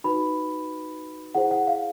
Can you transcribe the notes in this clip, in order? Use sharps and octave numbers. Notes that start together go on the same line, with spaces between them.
D#4 F#4 B4 B5
E4 G#4 C5 F#5
F#5
F5